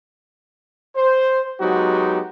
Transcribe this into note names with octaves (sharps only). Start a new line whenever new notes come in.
C5
F#3 G#3 B3 D#4 F#4 G4